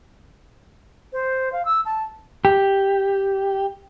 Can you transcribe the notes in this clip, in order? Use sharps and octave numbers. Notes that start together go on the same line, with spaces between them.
C5
F5
E6
A5
G4